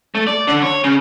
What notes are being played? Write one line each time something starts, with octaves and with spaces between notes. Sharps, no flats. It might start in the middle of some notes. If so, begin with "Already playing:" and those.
A3
D5
D3
C#5
C#3